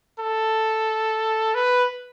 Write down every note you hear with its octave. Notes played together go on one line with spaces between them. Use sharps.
A4
B4